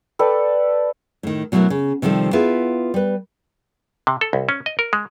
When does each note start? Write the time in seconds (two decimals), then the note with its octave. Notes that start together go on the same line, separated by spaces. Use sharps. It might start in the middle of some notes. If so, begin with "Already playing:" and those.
0.19 A4 B4 D5 G5
1.23 A2 D#3
1.52 B2 F#3 A3 E4 A#4
1.70 C#3
2.02 C3 D#3 F3 G3 A4
2.33 B3 E4 F4 G#4 B4
2.94 G3 B4
4.07 C3
4.21 A4
4.33 C2
4.49 C#4
4.66 D#5
4.79 A#4
4.93 G#3